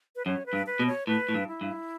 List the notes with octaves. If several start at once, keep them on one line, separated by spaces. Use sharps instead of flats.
B4
F#2 C#5
B4
G2
B4
B2
C#5
A2 B4
A2
G2
E4
G2